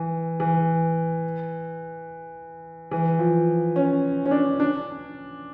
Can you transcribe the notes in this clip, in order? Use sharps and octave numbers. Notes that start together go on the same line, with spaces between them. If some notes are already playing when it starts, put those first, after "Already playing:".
Already playing: E3
E3
E3
F3
C#4
C#4
D4
D4